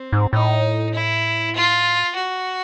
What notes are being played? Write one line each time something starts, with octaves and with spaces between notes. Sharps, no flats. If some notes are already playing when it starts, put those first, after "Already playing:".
Already playing: C4
G#2
A2 D#4
E4
F4
F#4